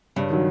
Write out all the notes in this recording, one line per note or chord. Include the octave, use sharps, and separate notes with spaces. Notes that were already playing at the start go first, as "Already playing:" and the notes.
G2 C#3
D#3 F#3